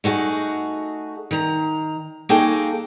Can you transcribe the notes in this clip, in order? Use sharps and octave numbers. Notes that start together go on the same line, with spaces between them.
A3 D#4 F#4 G#4
D#3 A#5
A#3 D#4 F#4 G#4 A4 G5